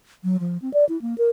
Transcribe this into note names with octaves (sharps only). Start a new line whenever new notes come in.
F#3
F3
C4
D5
E4
A#3
A#4